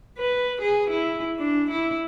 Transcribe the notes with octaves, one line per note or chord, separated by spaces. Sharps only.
B4
G#4
E4
D4
E4